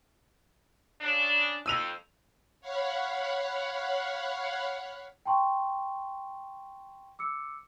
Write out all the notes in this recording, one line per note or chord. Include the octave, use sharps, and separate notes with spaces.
C#3 D4
F2 E6 D#7 F7
C#5 F5 F#5 B5
G5 A5 C6 C#6
D6 E6 C#7